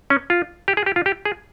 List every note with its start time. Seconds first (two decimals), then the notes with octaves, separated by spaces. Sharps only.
0.10 C#4
0.30 F4
0.68 G4
0.77 G#4
0.86 G4
0.96 F4
1.06 G4
1.25 G#4